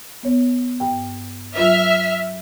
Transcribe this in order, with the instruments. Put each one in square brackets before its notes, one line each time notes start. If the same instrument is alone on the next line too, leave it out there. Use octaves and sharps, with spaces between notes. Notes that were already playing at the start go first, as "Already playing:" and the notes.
[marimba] B3 C#5
G2 G5
[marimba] F#3 F4 B4 [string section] E5 F6